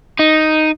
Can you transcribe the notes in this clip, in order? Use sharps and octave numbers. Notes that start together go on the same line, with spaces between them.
D#4